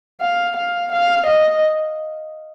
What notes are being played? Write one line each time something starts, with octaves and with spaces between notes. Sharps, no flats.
F5
F5
F5
D#5